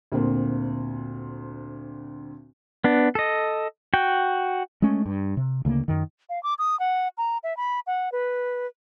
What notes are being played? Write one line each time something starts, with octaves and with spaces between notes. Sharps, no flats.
D2 A#2 C4
B3 D4
A4 D#5
F#4 G5
G#3 A3 C#4
G2
C3
D2 C#3 A3 A#3
F#2 D#3
F5
D6
D#6
F#5
A#5
E5
B5
F#5
B4